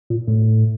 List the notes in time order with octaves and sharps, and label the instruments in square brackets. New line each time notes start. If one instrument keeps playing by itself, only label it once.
[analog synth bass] A#2
A2